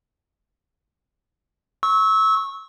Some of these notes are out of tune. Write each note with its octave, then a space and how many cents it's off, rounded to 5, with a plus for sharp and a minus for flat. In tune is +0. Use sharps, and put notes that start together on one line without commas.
C#6 -10 E6 -25